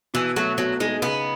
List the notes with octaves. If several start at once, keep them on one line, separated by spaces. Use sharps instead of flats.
B2 E3
F#3 A3
B2 F#3
G#3 D#4
C#3 B3